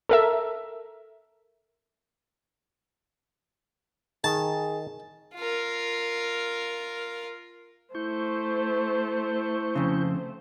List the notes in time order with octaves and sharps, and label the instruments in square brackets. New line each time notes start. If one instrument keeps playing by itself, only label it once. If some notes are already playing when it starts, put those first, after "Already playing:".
[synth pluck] A4 A#4 E5
[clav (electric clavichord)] D#3 [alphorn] G#4 [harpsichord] A5
[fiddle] F4 A#4
[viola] A3 C5 [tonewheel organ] E4 C#6 G6
[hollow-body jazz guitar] F2 C#3